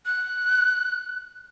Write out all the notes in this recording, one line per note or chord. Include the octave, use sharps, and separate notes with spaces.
F#6